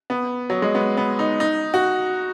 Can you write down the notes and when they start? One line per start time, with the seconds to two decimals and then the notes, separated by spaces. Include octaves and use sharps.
0.10 B3
0.50 F#3
0.62 G#3
0.75 B3
0.97 B3
1.19 D#4
1.40 D#4
1.74 F#4